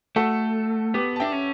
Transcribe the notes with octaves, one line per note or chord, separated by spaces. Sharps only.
A3 F#4 A4
B3 G4 B4
A5
D4 E5 G5
C#4